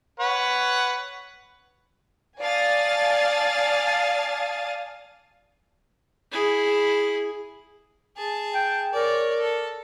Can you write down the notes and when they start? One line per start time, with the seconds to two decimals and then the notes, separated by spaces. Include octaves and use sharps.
0.20 B4 C#5 F#5
2.40 D5 F5 G#5 A5 D#6 A6
6.32 E4 G#4
8.17 G#4 A5
8.54 G5
8.93 A#4 C#5 D5
9.40 A4